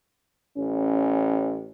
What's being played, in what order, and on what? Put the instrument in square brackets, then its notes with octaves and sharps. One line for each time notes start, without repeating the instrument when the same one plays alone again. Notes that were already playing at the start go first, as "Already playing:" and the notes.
[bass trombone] A1 [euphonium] C#4